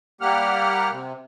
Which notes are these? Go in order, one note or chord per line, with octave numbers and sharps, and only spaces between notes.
G3 A#3 G4 F#5 F6
C3